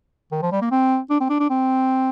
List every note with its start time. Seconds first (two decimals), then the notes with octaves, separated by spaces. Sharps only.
0.32 D#3
0.42 F3
0.52 G3
0.61 A#3
0.71 C4
1.10 D4
1.20 C4
1.29 D4
1.40 D4
1.50 C4